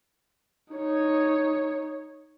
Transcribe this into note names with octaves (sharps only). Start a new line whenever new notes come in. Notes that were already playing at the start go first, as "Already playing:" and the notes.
D#4 C#5